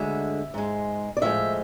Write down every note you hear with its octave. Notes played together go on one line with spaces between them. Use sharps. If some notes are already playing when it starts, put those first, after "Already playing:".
Already playing: D2 D3 G#3 E5
G#2 G#3
D5
A2 F3 G#3 E5